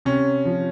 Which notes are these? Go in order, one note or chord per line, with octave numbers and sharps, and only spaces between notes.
C3 C#4
F3